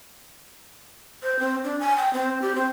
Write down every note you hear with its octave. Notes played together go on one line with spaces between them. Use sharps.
C5
C4
D4
G#5
G5
C4
G4
C4